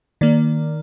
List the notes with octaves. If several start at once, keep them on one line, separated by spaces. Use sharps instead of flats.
D#3 A#3 D5